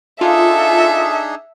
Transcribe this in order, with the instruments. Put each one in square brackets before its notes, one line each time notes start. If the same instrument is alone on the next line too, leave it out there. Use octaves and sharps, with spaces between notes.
[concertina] D4 D#4 G#4 [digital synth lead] F4 [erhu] A4 [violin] E5